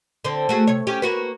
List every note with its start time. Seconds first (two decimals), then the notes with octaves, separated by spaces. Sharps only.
0.25 D3 C4
0.49 A3 F#4 G#4
0.67 C3 C#5
0.87 C#4 G4
1.02 A#3 F#4 B4